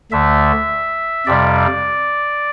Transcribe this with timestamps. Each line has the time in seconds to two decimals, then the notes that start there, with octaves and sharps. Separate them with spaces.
0.12 D2 D3 A3 E5
1.27 F2 C3 G3 D5